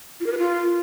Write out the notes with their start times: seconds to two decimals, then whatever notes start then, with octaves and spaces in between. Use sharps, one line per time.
0.20 F4
0.26 A#4
0.32 B4
0.38 F4